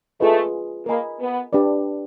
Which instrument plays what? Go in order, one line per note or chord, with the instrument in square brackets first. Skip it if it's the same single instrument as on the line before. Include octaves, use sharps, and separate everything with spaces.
[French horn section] A3 [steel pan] F4 G#4 B4 D#5
[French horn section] A#3 [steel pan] A#4 D#5 G#5 B5
[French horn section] B3
[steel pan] D4 G4 B4 D5